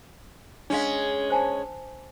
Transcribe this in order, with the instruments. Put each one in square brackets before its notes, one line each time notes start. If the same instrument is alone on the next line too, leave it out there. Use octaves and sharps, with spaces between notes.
[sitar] G#3 C#4 [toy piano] D4 F5
[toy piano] C5 G#5 A5